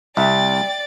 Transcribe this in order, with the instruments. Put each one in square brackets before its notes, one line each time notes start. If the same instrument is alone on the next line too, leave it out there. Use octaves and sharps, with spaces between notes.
[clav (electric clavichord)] C2 [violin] D5 A6 [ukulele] E5 [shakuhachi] G5